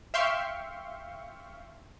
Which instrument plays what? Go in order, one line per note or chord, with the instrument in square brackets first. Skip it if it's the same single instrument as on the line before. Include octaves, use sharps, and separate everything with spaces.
[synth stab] E5 F5 G5 C6 C#6